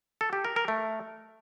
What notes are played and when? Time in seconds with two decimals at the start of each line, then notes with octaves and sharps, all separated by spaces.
0.21 A4
0.33 G4
0.44 A#4
0.56 A#4
0.68 A3